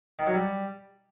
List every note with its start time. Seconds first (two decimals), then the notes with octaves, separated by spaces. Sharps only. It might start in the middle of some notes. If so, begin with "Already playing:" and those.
0.19 D#3
0.27 F#3
0.34 G3